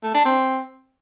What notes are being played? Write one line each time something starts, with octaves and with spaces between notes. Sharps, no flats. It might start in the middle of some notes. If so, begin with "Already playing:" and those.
A3
D4
C4